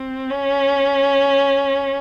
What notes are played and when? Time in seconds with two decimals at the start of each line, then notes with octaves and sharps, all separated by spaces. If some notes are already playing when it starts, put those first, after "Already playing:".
Already playing: C4
0.31 C#4